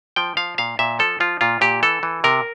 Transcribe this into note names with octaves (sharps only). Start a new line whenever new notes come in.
F3 G5
F3 F5
A#2 F5
A#2 E5
F3 A4
F3 F4
A#2 F4
A#2 G4
E3 A4
E3
C3 A#4